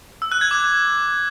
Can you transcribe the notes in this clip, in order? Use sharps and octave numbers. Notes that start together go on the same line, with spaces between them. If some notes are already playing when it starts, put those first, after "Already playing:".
E6
F#6
G#6
D6